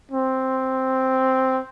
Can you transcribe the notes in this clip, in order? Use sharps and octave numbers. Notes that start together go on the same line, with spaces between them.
C4